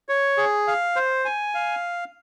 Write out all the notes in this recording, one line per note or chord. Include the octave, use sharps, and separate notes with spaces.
C#5
G#4
F5
C5
G#5
F5